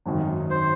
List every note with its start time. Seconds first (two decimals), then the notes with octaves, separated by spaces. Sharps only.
0.06 G#1 F#2 D#3
0.50 C5